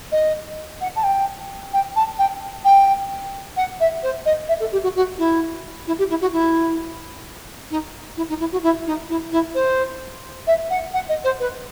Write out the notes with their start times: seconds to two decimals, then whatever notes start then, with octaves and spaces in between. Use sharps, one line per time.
0.12 D#5
0.81 F#5
0.96 A5
1.03 G5
1.73 G5
1.96 A5
2.19 G5
2.65 G5
3.57 F#5
3.80 E5
4.03 C5
4.26 D#5
4.49 E5
4.60 A4
4.72 G4
4.83 F#4
4.96 F#4
5.18 E4
5.87 E4
5.99 G4
6.10 E4
6.22 F#4
6.33 E4
7.71 D#4
8.17 E4
8.29 D#4
8.40 E4
8.52 F#4
8.63 E4
8.86 D#4
9.09 E4
9.32 E4
9.55 C5
10.47 E5
10.70 F#5
10.94 F#5
11.09 D#5
11.24 C5
11.40 B4